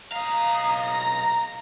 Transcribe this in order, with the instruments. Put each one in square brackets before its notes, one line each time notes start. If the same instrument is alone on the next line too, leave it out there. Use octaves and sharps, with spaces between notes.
[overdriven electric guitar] B1 F5 [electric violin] A#5 D#6
[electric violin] A#5 A#6